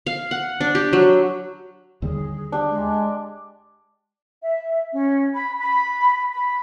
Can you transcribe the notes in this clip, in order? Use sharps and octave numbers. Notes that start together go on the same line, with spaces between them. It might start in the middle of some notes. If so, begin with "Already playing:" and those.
F5
F#5
D4
G4
F#3
D#2 D3 G3 G#4
D4 G4
G#3
E5
C#4
B5
B5
B5